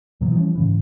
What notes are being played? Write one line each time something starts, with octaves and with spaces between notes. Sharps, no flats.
D#2 B2 E3 F#3
E3 F3 G3 C#4
G#2 C#3 E3